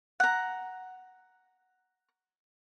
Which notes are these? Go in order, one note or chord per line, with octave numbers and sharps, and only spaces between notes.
F#5 A#5